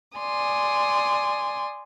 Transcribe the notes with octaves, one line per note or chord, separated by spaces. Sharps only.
D5 G#5 C6 D#6